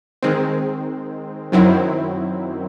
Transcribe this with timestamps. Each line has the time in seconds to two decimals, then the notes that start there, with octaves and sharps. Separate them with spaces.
0.22 D#3 G#3 C4
1.52 F#2 D#3 F#3 C4 E4